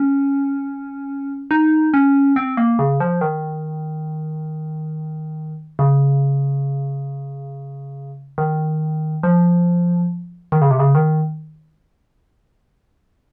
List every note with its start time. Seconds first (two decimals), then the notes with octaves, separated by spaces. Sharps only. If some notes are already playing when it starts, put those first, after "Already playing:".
Already playing: C#4
1.51 D#4
1.94 C#4
2.36 C4
2.57 A#3
2.79 C#3
3.00 F3
3.21 D#3
5.79 C#3
8.38 D#3
9.23 F3
10.52 D#3
10.62 C#3
10.71 C3
10.79 C#3
10.95 D#3